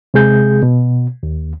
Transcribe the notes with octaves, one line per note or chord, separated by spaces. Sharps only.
C3 G#3 G#4 G6
B2
D#2